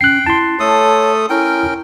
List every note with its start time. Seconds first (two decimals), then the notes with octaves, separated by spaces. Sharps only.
0.01 C#4 G5 F#6 C7
0.26 E4 A5 C6
0.60 A3 A4 C#5 D#6
1.30 C#4 E4 A#4 G5